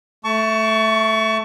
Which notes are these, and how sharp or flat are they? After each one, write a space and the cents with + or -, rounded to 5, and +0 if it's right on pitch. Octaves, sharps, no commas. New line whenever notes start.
A3 +0 A5 +0 C#6 +25